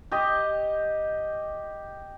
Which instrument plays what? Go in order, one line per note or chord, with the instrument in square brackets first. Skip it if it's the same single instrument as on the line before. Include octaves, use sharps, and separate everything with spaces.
[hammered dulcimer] G4 D#5